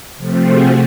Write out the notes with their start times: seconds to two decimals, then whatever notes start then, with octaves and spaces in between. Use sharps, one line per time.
0.17 C3 F3 A3 C4
0.47 F#4 G#4